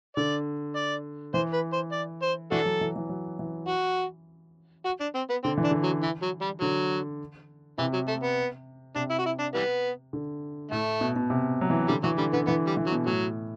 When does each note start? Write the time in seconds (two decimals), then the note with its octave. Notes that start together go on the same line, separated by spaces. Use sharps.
0.17 D3 D5
0.76 D5
1.34 E3 C5
1.53 B4
1.73 C5
1.92 D5
2.22 C5
2.51 E3 D4 F#4 A4
2.65 F#3
2.81 E3
2.96 E3
3.09 F#3
3.39 E3
3.68 F#4
4.85 F#4
5.01 D4
5.15 C4
5.30 B3
5.44 D3 C4
5.58 E3
5.64 D4
5.71 D3
5.84 F#3
6.03 E3
6.22 F#3
6.41 G3
6.61 D3 F#3
7.78 C3 E3
7.93 F#3
8.08 A3
8.23 B3
8.96 C3 D4
9.10 E4
9.19 F#4
9.26 E4
9.39 D4
9.55 E3 G3 B3
10.13 D3
10.71 A2 A3
11.01 B2
11.16 B2
11.30 C3
11.61 F#3
11.70 E3
11.88 D3 G3
12.04 E3 F#3
12.18 D3 G3
12.33 D3 B3
12.47 E3 B3
12.67 G3
12.77 E3
12.87 F#3
12.92 B2
13.07 A2 F#3